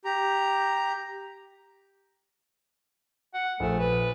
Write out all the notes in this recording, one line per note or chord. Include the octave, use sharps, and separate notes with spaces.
G4 A#5
F#5
A#1 A3
B4